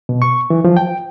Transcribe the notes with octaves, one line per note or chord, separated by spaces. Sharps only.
B2
C#6
E3
F3
G5